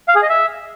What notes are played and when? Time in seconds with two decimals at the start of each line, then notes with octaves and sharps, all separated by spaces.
0.08 F5
0.15 G#4
0.22 D#5
0.29 E5